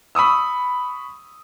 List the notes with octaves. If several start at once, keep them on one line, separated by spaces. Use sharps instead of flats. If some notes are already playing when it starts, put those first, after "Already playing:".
B5 C#6 D#6 E6